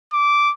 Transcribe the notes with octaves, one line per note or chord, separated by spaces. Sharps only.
D6